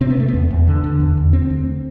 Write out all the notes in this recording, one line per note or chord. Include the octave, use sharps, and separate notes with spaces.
C3 C4
B3
C3 A3
B3
E2
E2
D3
D3
E2
E2
D3 C4
D2